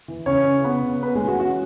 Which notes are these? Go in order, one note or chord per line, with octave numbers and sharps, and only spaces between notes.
E3
C#3 C#4 C#5
C#3
C#3 B3 B4
C#3
B3 C#4 B4
G#3 G#4
E3
F#4
C#4 F#4